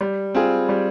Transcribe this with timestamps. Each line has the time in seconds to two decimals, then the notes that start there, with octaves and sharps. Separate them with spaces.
0.01 G3
0.35 C4 F4 G#4
0.69 G3